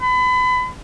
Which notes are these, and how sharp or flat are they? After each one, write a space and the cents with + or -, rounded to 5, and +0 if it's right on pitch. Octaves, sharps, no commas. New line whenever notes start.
B5 +30